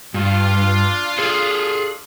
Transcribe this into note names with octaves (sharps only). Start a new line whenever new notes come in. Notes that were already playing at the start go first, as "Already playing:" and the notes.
G2 D4 F4
G#4 A4